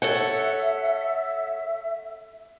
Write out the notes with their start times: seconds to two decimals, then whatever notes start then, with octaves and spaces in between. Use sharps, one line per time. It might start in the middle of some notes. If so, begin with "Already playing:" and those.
0.02 A4 C#5 E5 F#5